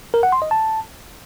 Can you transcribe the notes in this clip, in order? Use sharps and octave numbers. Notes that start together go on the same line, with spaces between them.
A#4
F#5
C6
D#5
A5